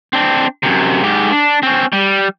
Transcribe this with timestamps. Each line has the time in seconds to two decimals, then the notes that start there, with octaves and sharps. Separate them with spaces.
0.13 C4 D4
0.63 F#2 C3
1.04 G#2 G4
1.32 D4
1.63 C4 C#4
1.93 G3